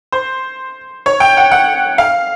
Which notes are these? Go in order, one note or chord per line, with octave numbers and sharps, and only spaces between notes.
C5
C#5
G5
F#5
F#5
F5